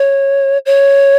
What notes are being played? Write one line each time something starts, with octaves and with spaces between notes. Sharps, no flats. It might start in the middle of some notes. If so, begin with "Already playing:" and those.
Already playing: C#5
C#5